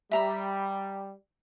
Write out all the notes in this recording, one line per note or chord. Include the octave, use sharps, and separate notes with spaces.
G3 E5 A#5 B5